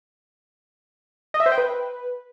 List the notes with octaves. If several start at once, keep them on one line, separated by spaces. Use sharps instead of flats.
D#5
E5
C5
G5
B4